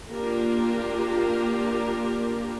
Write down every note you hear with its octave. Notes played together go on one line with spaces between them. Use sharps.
A#3 D4 F4 G4 A#4